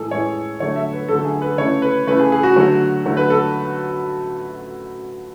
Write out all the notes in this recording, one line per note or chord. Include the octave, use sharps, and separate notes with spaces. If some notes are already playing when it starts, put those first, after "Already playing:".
Already playing: A2 E3 G#3 G#4 A4
A2 E3 G#3 C#5
D3 F#3 A3 C#5
E5
B4
D3 F#3 A3 A4
G#4
B4
C#3 E3 A3 C#5
B4
C#3 E3 A3 B4
G#4
G#4
F#4
D3 F#3 A3
D3 F#3 A3
B4
A4